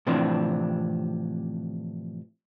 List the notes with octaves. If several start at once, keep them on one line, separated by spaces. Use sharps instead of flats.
A2 C3 E3 F3 C4 D4